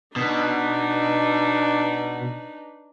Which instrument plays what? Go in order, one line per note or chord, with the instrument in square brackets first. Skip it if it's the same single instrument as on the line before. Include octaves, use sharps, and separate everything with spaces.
[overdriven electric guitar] B2 [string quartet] D4 D#4 B4